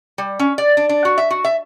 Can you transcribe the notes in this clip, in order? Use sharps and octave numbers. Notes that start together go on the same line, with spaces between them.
G3
C#4
D5
D4
D4
F#4
E5
F#4
E5